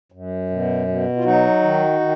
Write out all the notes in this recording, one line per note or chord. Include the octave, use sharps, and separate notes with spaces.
F#2
B2
B2
F4
F#3 D#4 F#4
D#3
D#3